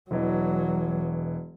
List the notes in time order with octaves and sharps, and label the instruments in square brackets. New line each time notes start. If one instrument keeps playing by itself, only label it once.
[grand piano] E1 E3 D#5 [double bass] F#3